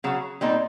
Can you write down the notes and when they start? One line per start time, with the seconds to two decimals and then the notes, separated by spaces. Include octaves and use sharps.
0.04 C#3 F#3 C#4
0.41 A#2 G3 C4 D#4